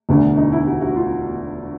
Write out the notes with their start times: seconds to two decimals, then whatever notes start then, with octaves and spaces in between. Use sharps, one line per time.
0.09 E1 D2 D3
0.37 D#4
0.52 E4
0.67 F#4
0.81 F#4
0.96 F4